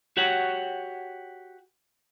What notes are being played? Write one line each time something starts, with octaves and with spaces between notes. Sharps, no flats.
F#4 G4 C#5 F#5